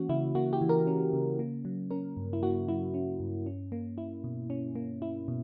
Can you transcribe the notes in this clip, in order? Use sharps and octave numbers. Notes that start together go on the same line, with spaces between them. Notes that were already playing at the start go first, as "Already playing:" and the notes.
Already playing: E3 A#3 C#4 F#4
C#3 E4
A#3 F#4
G4
E3
A#4
C#4
C#3
A#3
F#3
C#4 A#4
G2
E4
A#3 F#4
F#3 E4
C#4
G2
C#4
A#3
E4
B2
C#4
A#3
E4
B2